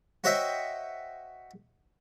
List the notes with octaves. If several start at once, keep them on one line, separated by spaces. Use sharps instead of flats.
F#4 C5 C#5 D#5 E5 G5